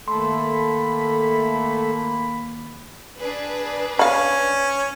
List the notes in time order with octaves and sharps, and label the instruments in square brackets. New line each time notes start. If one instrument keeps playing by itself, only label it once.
[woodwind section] D#3 A#3 B5 [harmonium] A3 A4 [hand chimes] C6
[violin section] D4 G#4 B4
[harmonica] C#4 [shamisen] F5 B5